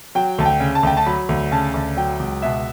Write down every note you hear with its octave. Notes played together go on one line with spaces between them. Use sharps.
F#3 G5
D2 A5
G5
C#3
A5
D2 G5
A5
F#3 B5
D2
C#3 A5
D2
F#3 G5
C#2
B2 E5